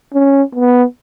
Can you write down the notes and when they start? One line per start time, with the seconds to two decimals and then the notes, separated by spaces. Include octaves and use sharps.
0.14 C#4
0.55 B3